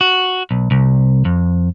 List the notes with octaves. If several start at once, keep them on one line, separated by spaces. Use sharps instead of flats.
F#4
B1
C2
F2